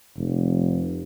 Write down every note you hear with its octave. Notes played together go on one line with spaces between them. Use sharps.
F1